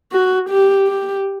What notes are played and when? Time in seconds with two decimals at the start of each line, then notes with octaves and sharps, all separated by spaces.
0.13 F#4
0.50 G4
0.88 G4